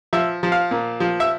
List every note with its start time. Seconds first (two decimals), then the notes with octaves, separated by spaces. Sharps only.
0.13 F3 E5
0.43 F3
0.52 F5
0.71 A#2
1.00 F3
1.20 E5